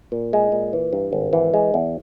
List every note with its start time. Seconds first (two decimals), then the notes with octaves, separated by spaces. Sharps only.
0.12 A#2
0.33 G#3
0.52 A#2
0.73 E3
0.93 G2
1.13 G#1
1.33 E3
1.54 G#3
1.74 E2